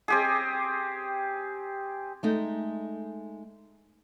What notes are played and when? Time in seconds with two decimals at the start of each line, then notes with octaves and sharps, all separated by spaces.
0.08 C4 G4 G#4
2.23 G#3 A3 D#4